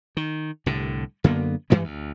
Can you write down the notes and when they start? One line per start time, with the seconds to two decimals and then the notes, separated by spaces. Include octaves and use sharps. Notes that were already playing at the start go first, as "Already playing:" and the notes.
0.17 D#3
0.66 C2 A2 D3
1.24 F#2 D3 A#3 B3
1.70 G2 E3 G3 G#3
1.84 D2